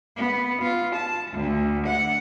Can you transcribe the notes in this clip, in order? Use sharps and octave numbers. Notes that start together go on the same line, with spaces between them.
B3
F4
A5
D2
F#5